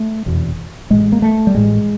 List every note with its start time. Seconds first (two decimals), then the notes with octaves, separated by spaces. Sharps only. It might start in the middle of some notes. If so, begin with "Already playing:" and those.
Already playing: A3
0.26 F1 E2 B2
0.90 A1 A2 G#3
1.12 A#3
1.22 A3
1.47 G3
1.54 A1 A2 G#3